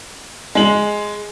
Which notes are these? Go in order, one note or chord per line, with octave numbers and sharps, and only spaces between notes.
G#3 F#7